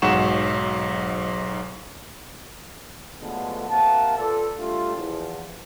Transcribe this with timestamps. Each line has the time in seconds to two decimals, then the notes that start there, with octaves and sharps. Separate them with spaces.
0.02 B1 G#2 F#3 F#5 C#6 E7
3.21 D3 F3 F#3 G#3 A3 B3
3.69 C3 A#3 A#4 F5 F#5 A5
4.18 F4 A4 B4 D5
4.57 G3 A3 D4 F4
4.95 E2 F3